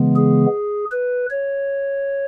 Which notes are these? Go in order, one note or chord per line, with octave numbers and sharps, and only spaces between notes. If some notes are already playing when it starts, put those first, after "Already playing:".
Already playing: C#3 E3 G#3 B3
G#4
B4
C#5